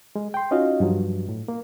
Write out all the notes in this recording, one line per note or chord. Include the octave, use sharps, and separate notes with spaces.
G#3
G5 C6
C#4 D#4 F4 F#4 D#5 F5
G2 F3 F#3
A2
A#3